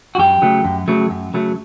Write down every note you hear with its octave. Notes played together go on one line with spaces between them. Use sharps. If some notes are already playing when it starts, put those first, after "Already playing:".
F#4
F#2 G4
C#3 F#3 A3
F#2
C#3 F#3 A3
F#2
C#3 F#3 A3